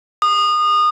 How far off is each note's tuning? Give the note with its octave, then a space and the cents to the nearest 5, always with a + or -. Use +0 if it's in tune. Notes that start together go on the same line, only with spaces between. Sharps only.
D#6 -25